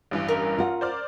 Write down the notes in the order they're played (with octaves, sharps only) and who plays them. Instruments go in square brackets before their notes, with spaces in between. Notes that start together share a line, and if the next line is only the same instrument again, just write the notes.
[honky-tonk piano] A1 G2 E3
[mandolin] C#4 A#4
[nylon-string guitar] F4 F#5
[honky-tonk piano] C5 D5 F6